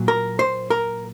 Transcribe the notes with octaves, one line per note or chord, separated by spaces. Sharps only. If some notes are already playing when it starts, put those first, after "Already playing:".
Already playing: A#2 F#3
A#4
C5
A#4